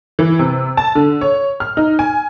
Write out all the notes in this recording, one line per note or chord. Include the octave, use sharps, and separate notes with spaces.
E3
C3
A5
D3
C#5
F6
D#4
G#5